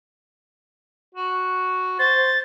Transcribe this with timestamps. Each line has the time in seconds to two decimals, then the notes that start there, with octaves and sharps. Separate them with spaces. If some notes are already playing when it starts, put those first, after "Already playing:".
1.15 F#4
1.99 C5 A6